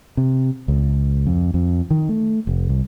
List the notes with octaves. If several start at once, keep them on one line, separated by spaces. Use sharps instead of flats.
C3
C#2
F2
F2
D#3
A3
F1
C2